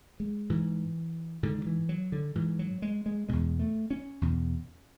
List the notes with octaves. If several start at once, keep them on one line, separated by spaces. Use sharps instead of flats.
G#3
G#2 E3
G#2 D3
D3
E3
F#3
D3
G#2 E3
F#3
G#3
G#3
E2 B2 G#3
A3
C#4
E2 B2